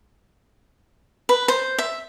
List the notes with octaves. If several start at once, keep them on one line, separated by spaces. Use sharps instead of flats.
B4
C5
E5